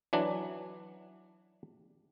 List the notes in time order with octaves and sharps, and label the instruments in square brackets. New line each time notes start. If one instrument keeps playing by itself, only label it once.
[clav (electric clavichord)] E3 F#3 D4